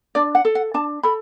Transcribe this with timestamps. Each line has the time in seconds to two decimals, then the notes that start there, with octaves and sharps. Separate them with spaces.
0.15 D4 D5
0.35 F#5
0.45 A4
0.55 F#5
0.74 D4 A5
1.03 A4 B5